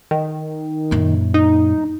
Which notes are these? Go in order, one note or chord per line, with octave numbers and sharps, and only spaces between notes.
D#3
F#2 A#2
D#4